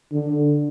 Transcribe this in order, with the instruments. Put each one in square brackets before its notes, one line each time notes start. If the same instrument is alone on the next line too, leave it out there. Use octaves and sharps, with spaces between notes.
[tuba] D3